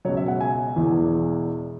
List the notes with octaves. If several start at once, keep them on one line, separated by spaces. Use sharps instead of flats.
C#2 B2 F#3 C#5
E5
F#5
G#5
E1 E2 E3